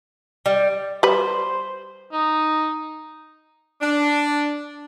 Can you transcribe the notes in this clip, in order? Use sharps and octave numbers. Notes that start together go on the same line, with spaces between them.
G3
G3 B4 C5
D#4
D4